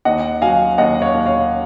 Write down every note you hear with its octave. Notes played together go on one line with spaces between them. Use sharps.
D#2 D#5 F#5
F#3 F5 G#5
D#2 D#5 F#5
C#5 F5
D#2
C#5 F5